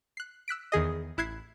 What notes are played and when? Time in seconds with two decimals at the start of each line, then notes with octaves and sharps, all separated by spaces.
0.17 F#6 C7
0.48 E6 F#6 B6 D7
0.72 E2 D#3 G#4 D#5
1.17 A1 E4 F#6 G#6 C7